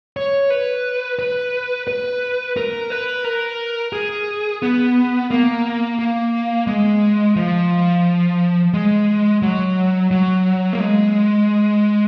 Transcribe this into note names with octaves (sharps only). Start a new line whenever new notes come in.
C#5
B4
B4
B4
A#4
B4
A#4
G#4
B3
A#3
A#3
G#3
F3
G#3
F#3
F#3
A#3
G#3